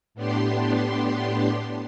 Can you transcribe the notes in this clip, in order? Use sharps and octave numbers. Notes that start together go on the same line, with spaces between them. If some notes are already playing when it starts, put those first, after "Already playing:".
A2 B3 D4 G4 C6